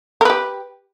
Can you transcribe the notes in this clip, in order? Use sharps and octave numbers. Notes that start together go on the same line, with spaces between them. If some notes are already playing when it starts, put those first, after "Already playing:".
G4 A#4 B4